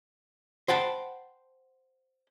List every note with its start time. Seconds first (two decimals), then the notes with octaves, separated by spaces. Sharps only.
0.68 C5 F#5 G5 A5 B5